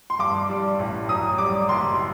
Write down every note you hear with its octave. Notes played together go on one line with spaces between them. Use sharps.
C6
G2 D6
G3
A1
F#2 D#6
G3 D6
F#1 C6